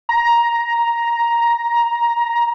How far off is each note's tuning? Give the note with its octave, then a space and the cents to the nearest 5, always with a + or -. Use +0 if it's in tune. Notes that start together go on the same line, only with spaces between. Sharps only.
A#5 +10